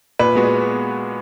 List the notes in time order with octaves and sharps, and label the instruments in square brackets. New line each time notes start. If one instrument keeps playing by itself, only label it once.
[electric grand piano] A#2 [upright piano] B4
[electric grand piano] G#3 B3 F#4